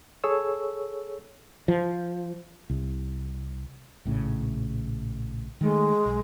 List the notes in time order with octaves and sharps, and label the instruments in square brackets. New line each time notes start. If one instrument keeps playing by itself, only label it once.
[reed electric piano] G#4 A4 C#5 E6
[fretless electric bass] F3
C2
A#1 A2 C#3
[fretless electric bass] D#3 A3 [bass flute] G#3
[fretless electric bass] B1